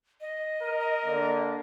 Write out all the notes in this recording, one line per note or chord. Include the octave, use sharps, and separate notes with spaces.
D#5
A#4
D3 A#3 D4